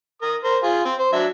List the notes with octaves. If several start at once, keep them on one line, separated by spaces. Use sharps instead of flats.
A#4 D#6
A#4 C5
F4 G#4
C4
C5
F#3 D4 E5